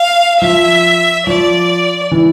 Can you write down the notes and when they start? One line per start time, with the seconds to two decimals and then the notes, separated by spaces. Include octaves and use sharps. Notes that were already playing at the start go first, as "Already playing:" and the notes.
Already playing: F5
0.41 F3 E5
1.27 F3 D5
2.11 E3